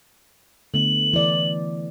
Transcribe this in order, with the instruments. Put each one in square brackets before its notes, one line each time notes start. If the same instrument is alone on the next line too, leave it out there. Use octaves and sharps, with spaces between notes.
[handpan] D3 A3 B3 [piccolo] F#7
[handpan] E3 D5